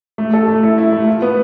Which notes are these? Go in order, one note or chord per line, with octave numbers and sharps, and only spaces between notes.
A3
A4
A3
E4
E4
A3
F4
B3